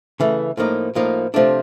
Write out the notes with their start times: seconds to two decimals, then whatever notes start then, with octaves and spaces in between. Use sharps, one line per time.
0.20 C#3 E3 A3
0.57 A2 F3 A#3 D#4
0.95 A2 F3 A#3 D#4
1.34 C3 F3 A3 D4